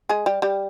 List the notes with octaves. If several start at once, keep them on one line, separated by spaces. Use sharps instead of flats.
G#3 G#4
G3 G4
G3 G4